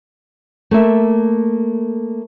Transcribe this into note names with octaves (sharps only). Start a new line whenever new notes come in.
A3 A#3 E5